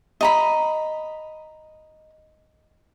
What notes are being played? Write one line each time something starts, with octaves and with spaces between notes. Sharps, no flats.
D#5 A#5 B5